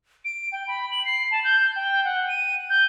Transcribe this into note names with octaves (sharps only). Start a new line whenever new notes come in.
D7
G5
B5
F#7
C7
A5
G6
G5
F#5
D#7
G6